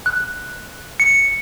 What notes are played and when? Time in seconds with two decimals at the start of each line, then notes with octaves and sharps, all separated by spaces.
0.06 F#6
1.00 C#7